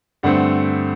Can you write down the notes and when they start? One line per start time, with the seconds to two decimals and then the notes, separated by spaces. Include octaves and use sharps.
0.23 G2 D3 A3 C4 F#5